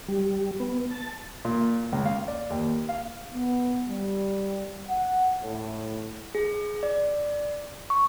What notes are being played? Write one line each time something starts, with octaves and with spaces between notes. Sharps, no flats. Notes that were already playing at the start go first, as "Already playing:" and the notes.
G3
B3
A5
A#2
C#2
F5
D5
D#2
F5
B3
G3
F#5
A2
G#4
D5
C#6